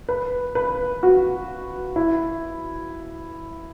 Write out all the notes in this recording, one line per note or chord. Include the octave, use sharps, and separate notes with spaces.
B4
B4
F#4
E4